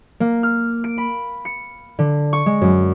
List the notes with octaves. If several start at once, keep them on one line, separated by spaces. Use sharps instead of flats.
A#3
F6
D7
B5
C#7
D3
C#6
G#3
F#2